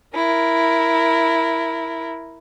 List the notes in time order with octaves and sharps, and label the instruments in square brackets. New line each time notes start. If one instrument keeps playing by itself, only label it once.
[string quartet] E4 A#4